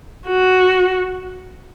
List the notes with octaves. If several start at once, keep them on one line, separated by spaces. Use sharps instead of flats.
F#4